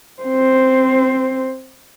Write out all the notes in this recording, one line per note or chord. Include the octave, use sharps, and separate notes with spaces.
C4 C5